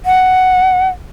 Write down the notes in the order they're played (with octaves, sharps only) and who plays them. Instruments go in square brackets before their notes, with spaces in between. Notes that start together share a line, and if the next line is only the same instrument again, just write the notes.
[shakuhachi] F#5